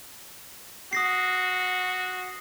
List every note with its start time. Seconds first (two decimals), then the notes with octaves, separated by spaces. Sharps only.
0.93 F#4 D#6 A#6 C7